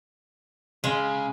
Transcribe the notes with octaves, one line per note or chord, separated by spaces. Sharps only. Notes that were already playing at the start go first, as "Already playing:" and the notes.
C#3 G#3